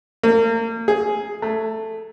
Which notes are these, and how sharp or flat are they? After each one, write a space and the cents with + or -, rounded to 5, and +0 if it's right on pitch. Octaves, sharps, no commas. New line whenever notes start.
A#3 -35
G#4 +5
A3 +10